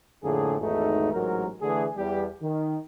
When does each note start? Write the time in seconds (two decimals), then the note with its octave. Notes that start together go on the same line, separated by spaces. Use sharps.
0.24 F2 A2 D3 A#3 G#4
0.60 G#1 E2 G#2 A3 D#4 A4
1.13 A1 G#2 F#3 A#4
1.62 D3 E3 A3 G#4
1.97 E2 G3 G4
2.42 D#3